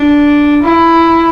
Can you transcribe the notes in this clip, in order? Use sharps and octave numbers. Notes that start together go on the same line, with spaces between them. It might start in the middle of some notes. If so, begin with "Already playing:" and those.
Already playing: D4
E4